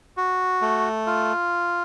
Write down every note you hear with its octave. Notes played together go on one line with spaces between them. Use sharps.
F#4
A3
F4